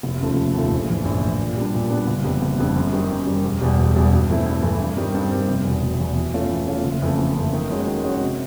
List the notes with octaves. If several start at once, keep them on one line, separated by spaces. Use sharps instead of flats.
F1
D#2 C#3 F3 A3
F1
D#2 C#3 F3 A3
A#1
A2 E3
A#1
A2 E3
A#2
G3 B3 D4
A#2
G3 B3 D4
F#1
F2 D3 G3 B3
F#1
F2 D3 G3 B3
F#2
D#3 G3
F#2
D#3 G3
E1
E2 B2 G3
E1
E2 B2 G3
G2
E3 A3 C4 E4
G2
E3 A3 C4 E4
G2
D#3 G3 C4
G2
D#3 G3 C4
F1
E2 B2
F1
E2 B2
E3
A3 C#4 F4
E3
A3 C#4 F4
F#1
F2 C#3 E3 A3
F#1
F2 C#3 E3 A3
D#3
G#3 C#4 F#4
D#3
G#3 C#4 F#4
C3